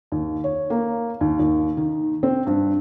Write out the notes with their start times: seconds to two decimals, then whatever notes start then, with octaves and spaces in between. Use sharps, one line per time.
0.12 D#2
0.44 C#5
0.70 A#3
1.21 D#2
1.39 D#2
1.77 D#3
2.23 C4
2.47 G2